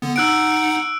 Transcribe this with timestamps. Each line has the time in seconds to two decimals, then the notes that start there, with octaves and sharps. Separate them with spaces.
0.02 D3 B3
0.16 D#4 F#5 E6 F#6 D7